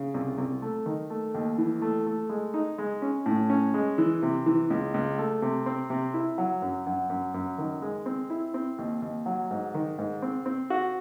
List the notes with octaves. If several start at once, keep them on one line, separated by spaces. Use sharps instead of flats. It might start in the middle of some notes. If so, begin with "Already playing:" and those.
Already playing: C#3
C2
C2
A3
D#3
A3
D#2
E3
A3
A3
G#3
D#4
G#3
C#4
A2
C#4
G#3
E3
C3
E3
C#2
C#2
A3
C3
C4
C3
E4
F#3
F#2
F#2
F#2
F#2
D#3
G#3
C4
E4
C4
D#2
D#2
F#3
G#2
D#3
G#2
C4
C4
F#4